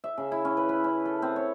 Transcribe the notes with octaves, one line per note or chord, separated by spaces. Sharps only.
E5
C#3
E4
C#4
B4
B4
C#4
A4
C4
C#5